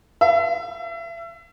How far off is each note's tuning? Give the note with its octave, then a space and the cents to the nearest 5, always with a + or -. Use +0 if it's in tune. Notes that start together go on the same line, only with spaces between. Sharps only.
E5 +35